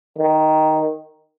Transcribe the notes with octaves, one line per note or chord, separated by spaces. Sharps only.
D#3